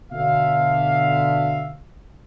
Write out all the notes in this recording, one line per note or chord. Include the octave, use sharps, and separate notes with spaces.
B2 D3 E5 F5